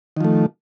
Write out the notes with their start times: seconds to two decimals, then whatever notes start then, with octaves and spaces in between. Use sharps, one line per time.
0.17 D#3
0.21 F3
0.24 A3